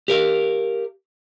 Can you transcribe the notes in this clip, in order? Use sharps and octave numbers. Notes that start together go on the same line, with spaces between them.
G4 A#4 F5